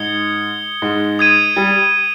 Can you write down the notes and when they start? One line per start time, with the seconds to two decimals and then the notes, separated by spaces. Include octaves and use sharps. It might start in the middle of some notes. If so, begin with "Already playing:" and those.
Already playing: G#2 G#3 D#6 G#6 C#7 G7
0.82 G#2 G#3
1.19 D#6 G#6 D#7
1.56 G3